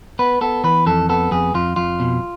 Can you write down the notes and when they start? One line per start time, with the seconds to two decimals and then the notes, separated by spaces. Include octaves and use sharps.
0.19 B3 B4
0.41 B3 A4
0.64 E3 B4
0.86 F2 A4
1.09 B3 A4
1.31 F2 G#4
1.54 F2 F4
1.76 F2 F4
2.00 B2